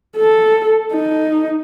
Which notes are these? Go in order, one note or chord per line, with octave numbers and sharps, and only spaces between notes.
A4
D#4